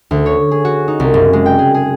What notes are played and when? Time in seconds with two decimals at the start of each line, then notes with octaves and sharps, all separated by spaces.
0.11 D2
0.26 C#5
0.51 G#4
0.65 F#4
0.88 D#4
1.00 C2
1.14 F#1
1.33 G#3
1.46 G5
1.59 G#4
1.74 G#4